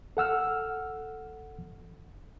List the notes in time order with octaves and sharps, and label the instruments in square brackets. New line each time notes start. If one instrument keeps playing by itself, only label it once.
[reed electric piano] A4 F#5 E6 F6